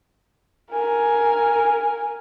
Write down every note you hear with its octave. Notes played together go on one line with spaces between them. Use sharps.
A#4 G#5